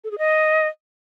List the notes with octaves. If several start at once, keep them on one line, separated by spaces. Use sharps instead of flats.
A4
G#4
D#5